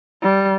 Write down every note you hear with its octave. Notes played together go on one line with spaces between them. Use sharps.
G3